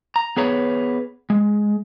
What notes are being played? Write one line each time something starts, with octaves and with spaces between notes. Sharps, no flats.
A#5
B3 G#4 B4 C#5
G#3